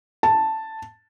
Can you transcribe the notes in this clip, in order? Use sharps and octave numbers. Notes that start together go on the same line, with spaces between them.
A5